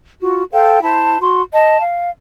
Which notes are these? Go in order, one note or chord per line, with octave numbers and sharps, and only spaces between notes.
F4 F#4
A4 C5 F5 G5
E4 C5 A5
F#4 C6
D#5 A5
F5